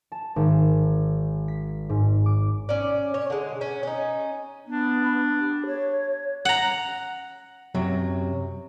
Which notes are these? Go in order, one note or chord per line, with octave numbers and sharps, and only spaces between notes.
A5
G#1
B6
G#2
D6
C#4 D5
C#5
D3 G#3
C#4
C#4 D#4
B3 D4
G4
C#5
F#5 A#5
F#2 C3 F#3